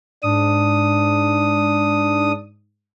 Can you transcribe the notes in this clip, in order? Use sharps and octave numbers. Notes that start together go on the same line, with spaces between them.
G#2 D4 D#6